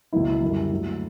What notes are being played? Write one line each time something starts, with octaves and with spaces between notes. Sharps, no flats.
C#2 B2 F#3 A#3 E4
F#2 D3 G3
D2 D3 F#3 A#3